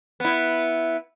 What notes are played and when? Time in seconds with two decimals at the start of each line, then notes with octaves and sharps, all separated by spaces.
0.20 B3 E4